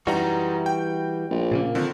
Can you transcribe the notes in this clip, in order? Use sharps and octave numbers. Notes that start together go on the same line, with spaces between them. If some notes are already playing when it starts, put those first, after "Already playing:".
F#2 E3 G3 D#4 F#4 A#5
G5
A#1
A#2 C#3 A#3
F2 D3 D#3